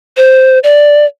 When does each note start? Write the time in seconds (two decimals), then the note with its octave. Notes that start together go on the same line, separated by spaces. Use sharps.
0.17 C5
0.64 D5